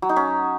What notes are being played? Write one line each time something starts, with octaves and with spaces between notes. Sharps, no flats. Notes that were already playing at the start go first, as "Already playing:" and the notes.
F#3
D#4
C#4